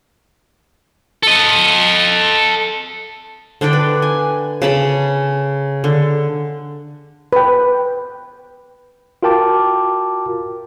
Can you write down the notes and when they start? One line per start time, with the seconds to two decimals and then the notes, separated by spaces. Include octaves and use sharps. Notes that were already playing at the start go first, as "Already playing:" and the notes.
1.23 A4 D#5
3.61 D3 D4 D5 G5
3.73 B4
4.02 G#5
4.62 C#3 A5 B5
5.84 D3
7.33 B4 G5
9.23 F4 F#4 A#4 G5 A5 D6